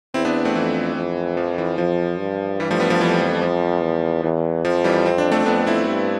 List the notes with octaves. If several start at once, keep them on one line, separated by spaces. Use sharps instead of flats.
E2 C4 E4
B3 D4
A3 C4
F2 E3
F2
F3
E3
F2 F3
G2
E3 G3
F3 A3
G3 B3
F3 A3
F2 E3 G3
F3
F3
E2
E2 E3
F2 F3
E3 G3
C4
D4
A3 C4
F2 B3 D4
C4 E4
G2